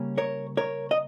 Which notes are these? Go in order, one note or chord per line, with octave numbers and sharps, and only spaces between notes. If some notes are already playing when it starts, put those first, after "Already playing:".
Already playing: C#3 G3 A#3 C#4
A#4 C#5
A#4 C#5
D#5